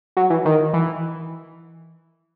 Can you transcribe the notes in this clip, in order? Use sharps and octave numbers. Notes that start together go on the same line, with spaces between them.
F#3
E3
D#3
E3